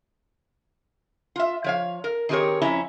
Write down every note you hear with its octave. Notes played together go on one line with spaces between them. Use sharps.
F4 E5
F3 C#5 F5
A#4
D#3 C4 G4 G#4 A#4 C#5
F2 C#4 E4 E5 A#5